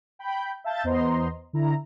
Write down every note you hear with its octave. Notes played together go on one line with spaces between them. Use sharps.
G5 B5 G6
E5 F5 A5 G6 A6
E2 B3 C5 D#5 A#5 C6
D3 E4 A#5